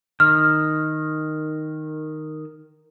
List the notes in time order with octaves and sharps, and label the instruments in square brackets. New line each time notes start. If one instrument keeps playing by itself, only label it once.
[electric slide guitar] D#3 [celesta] F6